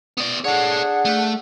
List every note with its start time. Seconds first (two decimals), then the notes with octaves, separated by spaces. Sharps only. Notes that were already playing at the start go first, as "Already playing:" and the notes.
0.17 B3 D5
0.44 D4 G#4 A4 C#5 F#5
1.05 A3